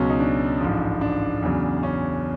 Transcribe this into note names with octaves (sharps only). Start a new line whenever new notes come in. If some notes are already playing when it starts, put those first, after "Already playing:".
Already playing: C#2 B2 F#3 C#4
D#4
D4
A1 G#2 F3
D4
E2 C#3 F#3
C#4